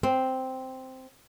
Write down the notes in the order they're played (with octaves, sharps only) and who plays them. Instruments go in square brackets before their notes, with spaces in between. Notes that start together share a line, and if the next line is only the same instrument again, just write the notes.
[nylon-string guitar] C4